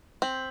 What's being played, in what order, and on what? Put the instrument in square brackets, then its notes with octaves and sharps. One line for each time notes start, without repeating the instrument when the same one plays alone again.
[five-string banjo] C4 [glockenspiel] G6 B6 F#7